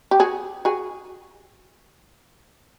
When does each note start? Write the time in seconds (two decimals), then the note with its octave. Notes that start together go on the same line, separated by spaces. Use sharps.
0.11 G4
0.20 F#4 G#4
0.65 F#4 G#4